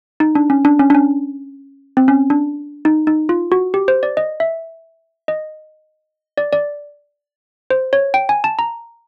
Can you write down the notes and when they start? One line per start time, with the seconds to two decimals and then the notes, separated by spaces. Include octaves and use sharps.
0.20 D#4
0.35 D4
0.50 C#4
0.65 D4
0.80 C#4
0.90 D4
0.95 C#4
1.97 C4
2.08 C#4
2.30 D4
2.85 D#4
3.07 D#4
3.29 F4
3.52 F#4
3.74 G4
3.88 C5
4.03 D5
4.17 D#5
4.40 E5
5.28 D#5
6.38 D5
6.53 D5
7.70 C5
7.93 C#5
8.14 G5
8.29 G#5
8.44 A5
8.59 A#5